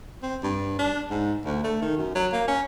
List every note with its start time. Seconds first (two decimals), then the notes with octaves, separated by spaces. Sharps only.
0.23 C4
0.43 G2
0.79 D4
1.10 G#2
1.45 D2
1.64 A3
1.82 D#3
1.97 F#2
2.15 F#3
2.33 A#3
2.48 C#4